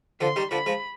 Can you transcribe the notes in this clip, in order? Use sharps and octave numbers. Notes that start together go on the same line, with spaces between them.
D3 F3 C6
D#3 G3
D3 F3 B5
F3 G#3